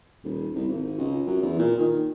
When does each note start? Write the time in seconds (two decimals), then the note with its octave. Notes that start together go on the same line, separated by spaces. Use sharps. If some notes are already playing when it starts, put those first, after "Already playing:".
0.24 D#1
0.55 C2
0.68 G#1
0.99 C#2
1.26 F#2
1.42 E2
1.59 A#2
1.79 D#3